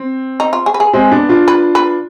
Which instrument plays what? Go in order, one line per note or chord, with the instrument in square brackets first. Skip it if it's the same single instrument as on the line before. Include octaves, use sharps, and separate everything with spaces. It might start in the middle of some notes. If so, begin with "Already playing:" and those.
Already playing: [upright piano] C4
[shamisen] D#4
F4
G#4
B4
G#4
[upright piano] G#3 C4
B3 D4
D4 F4
[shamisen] B4
B4